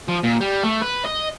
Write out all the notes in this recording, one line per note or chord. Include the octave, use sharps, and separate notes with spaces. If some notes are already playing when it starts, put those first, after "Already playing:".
F3
A#2
G3
A3
B4
D#5